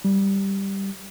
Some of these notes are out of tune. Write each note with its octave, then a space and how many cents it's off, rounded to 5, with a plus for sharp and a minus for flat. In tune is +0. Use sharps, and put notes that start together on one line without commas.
G3 +0